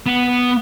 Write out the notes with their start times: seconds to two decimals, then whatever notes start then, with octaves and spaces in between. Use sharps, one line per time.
0.06 B3